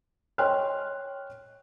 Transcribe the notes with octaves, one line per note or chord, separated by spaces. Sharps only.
C#5 D#5 G5 C6 F6 F#6